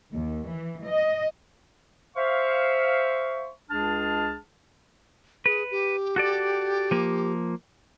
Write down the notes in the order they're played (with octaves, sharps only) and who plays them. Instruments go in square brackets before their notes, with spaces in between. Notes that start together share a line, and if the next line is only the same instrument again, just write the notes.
[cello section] D#2
E3
D#5
[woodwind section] C5 E5 F5 C#6
C#2 G#3 D4 G#4 A5 F6
[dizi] G#4 [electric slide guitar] B4
[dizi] G4
[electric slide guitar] F#4 A4 D5
F3 A#3